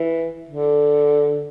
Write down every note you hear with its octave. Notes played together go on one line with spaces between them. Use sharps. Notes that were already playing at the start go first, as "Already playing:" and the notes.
Already playing: E3
D3